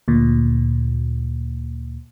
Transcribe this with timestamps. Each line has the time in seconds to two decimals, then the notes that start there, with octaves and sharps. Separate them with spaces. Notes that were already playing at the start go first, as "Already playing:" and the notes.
0.08 D2 A#2